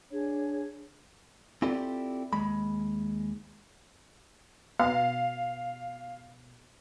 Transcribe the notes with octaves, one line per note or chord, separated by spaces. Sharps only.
D4 G#4 C#5
C4 E4 F4 G4 A4 D5
D#2 G#3 B5
B2 F5